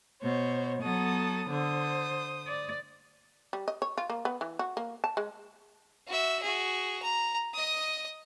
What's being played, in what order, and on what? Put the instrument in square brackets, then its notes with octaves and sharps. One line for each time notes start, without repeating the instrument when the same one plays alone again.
[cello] B2 [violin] C5 C#5
[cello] F#3 B3 [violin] A4 D#6
[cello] D3 [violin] C5 D#6
[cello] D5
[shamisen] G3
D#5
C#5
F4
A#3
B3
E3
F#4
A#3
A5
G#3
[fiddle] F#4 E5
F#4 G#4
A#5
D#5 D#6